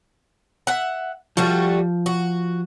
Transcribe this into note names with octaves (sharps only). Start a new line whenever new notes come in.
E5 F#5
F3 G3 A3 F#4
F#4